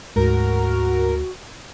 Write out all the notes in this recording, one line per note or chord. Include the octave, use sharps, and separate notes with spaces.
D2 G#2 F#4 A#4